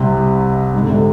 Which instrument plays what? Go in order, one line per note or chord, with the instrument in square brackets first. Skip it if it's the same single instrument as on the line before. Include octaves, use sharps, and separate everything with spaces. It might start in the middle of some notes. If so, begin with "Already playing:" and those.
Already playing: [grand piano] C2 C3
G#2
D3
C3